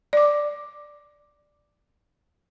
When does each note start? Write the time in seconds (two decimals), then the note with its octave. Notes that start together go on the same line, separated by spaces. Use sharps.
0.13 D5 D6